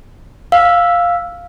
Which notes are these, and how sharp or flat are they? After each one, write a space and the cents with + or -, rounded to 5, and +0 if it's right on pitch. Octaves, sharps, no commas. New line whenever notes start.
F5 +5 E6 +0